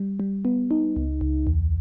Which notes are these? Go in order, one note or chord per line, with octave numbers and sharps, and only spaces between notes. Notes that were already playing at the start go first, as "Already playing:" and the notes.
Already playing: G3
G3
B3
D#4
C#2
C#2
E2